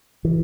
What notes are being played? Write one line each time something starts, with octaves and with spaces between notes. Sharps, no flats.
E3